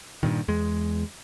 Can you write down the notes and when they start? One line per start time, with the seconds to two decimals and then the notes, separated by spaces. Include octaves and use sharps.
0.23 G2 A#2 D#3
0.48 E2 G#3